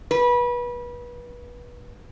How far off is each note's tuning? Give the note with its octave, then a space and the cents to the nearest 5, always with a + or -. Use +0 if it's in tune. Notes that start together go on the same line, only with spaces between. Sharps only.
B4 -30